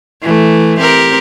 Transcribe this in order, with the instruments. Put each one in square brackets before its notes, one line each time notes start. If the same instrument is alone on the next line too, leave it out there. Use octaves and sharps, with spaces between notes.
[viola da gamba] E3 A3
C4 G4 A#4